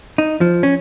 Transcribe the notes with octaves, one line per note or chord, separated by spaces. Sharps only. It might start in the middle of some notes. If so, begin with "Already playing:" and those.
D#4
F3
C#4